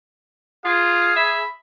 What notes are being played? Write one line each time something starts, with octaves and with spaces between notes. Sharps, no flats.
F4 G#4 F5
E5 B5